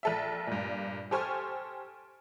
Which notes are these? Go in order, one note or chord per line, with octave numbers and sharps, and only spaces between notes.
A#1 A4 E5
G2 A#2
G4 A4 C5 G#5 C#6 F6